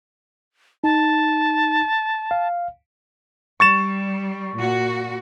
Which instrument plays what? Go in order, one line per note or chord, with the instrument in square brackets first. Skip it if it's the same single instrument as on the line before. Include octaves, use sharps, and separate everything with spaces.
[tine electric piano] D#4 [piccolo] A5
[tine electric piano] F5
[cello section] G3 [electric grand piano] C#6 A6 E7
[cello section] A#2 F#4